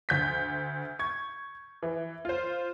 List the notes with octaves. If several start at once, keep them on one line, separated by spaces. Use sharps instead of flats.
D2 G6 B6
C#6 G#6
E3
F4 C5